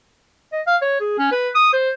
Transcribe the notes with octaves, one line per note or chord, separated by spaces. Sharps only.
D#5
F5
C#5
G#4
C#4
B4
D#6
C5